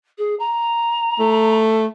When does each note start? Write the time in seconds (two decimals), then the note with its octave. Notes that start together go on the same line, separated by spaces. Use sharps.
0.18 G#4
0.39 A#5
1.19 A3